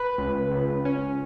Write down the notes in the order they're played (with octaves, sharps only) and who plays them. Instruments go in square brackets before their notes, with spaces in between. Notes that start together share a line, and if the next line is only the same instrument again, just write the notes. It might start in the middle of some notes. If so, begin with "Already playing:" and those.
Already playing: [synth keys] B4
C#2
C#2
C#4